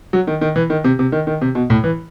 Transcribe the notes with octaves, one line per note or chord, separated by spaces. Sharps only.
F#3
D#3
D#3
E3
D#3
C3
C3
D#3
D#3
C3
B2
A2
E3